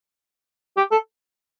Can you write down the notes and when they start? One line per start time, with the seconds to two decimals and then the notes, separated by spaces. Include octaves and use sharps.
0.77 G4
0.91 A4